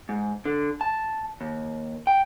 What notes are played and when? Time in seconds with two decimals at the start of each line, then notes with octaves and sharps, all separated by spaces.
0.09 G#2
0.45 D3
0.81 A5
1.41 D#2
2.07 G5